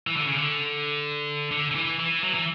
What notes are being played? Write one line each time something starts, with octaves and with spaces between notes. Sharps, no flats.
E3
D3
C#3
D3
D3
D3
E3
E3
F#3
E3